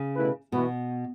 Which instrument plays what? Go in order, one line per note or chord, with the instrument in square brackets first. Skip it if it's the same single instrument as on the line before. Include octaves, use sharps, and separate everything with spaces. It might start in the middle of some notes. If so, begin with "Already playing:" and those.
Already playing: [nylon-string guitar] C#3
[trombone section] B2 A3 E4 B4
[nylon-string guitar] B2 [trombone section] E3 B3 F#4 B4